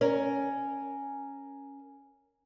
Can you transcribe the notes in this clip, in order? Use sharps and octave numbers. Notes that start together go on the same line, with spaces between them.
C#4 A#4